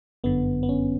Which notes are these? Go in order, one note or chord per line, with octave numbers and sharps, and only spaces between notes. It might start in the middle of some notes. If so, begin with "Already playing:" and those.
G1 F#2 D3 B3
B3
C#4